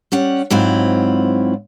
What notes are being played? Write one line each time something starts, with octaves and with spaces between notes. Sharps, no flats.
G3 C#4 F#5
G#2 F#3 C4 E4 F4